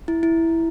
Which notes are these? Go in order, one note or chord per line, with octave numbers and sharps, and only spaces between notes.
E4
E4